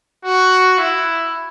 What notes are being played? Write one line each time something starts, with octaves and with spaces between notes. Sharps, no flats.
F#4
E4